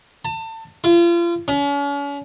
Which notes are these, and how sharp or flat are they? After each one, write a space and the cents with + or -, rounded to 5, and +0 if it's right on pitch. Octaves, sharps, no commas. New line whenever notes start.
A5 +30
F4 -35
C#4 +40